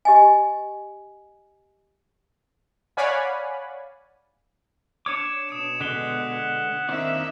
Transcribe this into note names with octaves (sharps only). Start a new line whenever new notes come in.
G4 D#5 G#5
C#5 D5 F5 F#5 G#5 B5
D4 C#5 D6 G#6 C#7 E7
B2 D#6 D7 E7
D3 G#3 F#5 F#6 B6 G7
D#3 A#3 C4 D4 D#4 E5 E7